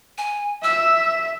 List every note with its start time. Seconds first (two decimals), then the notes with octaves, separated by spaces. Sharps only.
0.18 G#5
0.64 E5 E6